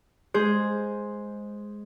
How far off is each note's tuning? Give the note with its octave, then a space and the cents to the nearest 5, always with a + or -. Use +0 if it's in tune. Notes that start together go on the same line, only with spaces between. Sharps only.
G#3 +0 G#4 +0 C5 +0